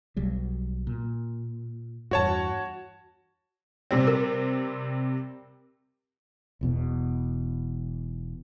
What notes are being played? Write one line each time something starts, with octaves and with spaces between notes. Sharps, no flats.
B1 F#3 G3
A#2
E2 G2 F#4 C#5 A5
C3 G3 C4
A#4
E1 E2 B2